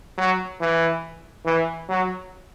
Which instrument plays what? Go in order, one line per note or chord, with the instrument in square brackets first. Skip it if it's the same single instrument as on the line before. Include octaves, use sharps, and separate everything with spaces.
[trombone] F#3
E3
E3
F#3